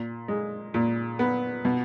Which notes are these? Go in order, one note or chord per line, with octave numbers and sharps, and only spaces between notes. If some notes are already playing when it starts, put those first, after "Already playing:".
Already playing: A#2
G#3
A#2
B3
B2